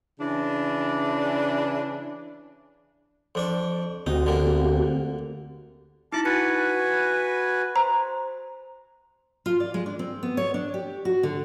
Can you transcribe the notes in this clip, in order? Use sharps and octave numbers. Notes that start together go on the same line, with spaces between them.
C#3 E3 D4
F2 D4 C#6
D2 C4 D#4 F#4 G4
D3 A#3
D#4 E4 A5 D6
F#4 B4 G#5 A6 C#7
C5 A#5
F4
D5
G#3
D4
C4
B3
C#5
D4
G4
F#4
D3